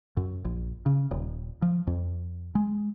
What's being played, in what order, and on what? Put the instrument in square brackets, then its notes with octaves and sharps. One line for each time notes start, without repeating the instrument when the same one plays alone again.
[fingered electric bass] F#2
A#1
C#3
D#1
F3
F2
G#3